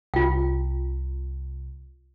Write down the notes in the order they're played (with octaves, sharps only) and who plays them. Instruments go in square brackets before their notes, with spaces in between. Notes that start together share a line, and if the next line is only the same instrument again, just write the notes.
[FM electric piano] C2 [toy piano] F4 G5